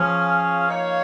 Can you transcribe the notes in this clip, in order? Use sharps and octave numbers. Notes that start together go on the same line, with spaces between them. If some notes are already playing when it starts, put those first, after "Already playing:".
Already playing: F3 C#4 F4 G#4 C#5 F5
A#3 D#4 C#5 F5